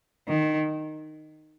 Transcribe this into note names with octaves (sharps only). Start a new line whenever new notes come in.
D#3